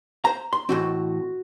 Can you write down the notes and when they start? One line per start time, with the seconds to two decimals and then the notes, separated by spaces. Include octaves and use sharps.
0.25 C5 A#5
0.53 C6
0.69 A2 E3 C4 F#4